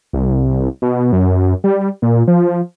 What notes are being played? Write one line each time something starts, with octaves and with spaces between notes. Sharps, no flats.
C2
B2
F#2
G3
A#2
F3